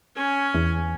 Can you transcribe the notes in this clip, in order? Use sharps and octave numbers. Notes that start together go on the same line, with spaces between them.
C#4 G#5
E2